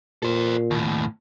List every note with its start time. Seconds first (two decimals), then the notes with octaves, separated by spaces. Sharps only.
0.23 A#2 A4 C5
0.71 D#2 A2